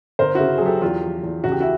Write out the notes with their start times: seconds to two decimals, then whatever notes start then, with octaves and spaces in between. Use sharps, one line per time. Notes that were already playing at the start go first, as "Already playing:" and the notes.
0.19 G1 A#4 C5
0.35 C#3 E4 F#4
0.58 F#3 G#4
0.66 G4 A4
0.81 E2 F4 G4
1.03 F3
1.23 E2
1.44 C#2 F#4
1.52 G4
1.60 E4 F#4